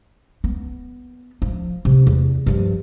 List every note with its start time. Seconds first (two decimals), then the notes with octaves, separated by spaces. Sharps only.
0.44 B3
1.42 F3
1.85 C3
2.07 E2
2.46 G2 F3